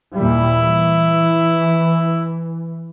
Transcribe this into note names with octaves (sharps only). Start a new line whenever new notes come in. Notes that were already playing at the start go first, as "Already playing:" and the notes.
D#2 A#2 G3 E4
E3